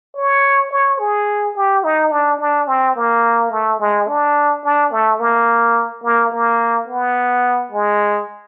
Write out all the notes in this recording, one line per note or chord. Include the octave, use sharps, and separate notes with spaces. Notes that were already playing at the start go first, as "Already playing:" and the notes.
C#5
C#5
G#4
G4
D#4
D4
D4
C4
A#3
A3
G#3
D4
D4
A3
A#3
A#3
A#3
B3
G#3